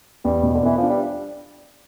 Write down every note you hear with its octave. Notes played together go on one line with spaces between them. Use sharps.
E2 G3
B2
D3
E3 B3
F3 D4
G3